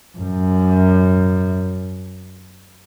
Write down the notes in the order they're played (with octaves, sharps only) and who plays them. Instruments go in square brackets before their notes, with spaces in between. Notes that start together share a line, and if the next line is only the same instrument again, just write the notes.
[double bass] F#2